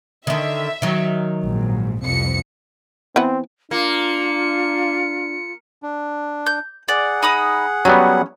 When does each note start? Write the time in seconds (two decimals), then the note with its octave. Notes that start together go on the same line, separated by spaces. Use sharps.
0.27 D3 D#3 E5
0.82 D#3 F#3
1.43 A#1 G#2
2.02 C2 F2 C#7
3.16 E3 B3 C4 F#5
3.71 A#3 D4 F4 C#7
5.83 D4
6.46 G6
6.88 G#4 D5 F#5
7.23 D#4 B5 D#6
7.85 F#3 G3 B3 C#4